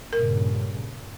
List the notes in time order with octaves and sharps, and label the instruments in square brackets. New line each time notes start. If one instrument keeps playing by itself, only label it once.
[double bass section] G2 A#2 C#3 [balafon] A#4